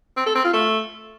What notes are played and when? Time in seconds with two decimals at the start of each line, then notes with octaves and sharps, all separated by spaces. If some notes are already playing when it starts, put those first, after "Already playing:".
0.17 C4
0.26 A4
0.35 C4
0.44 F4
0.53 A3